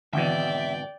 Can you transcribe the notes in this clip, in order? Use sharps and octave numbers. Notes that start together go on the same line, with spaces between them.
G#1 B2 D3 E3 D5 E5 G5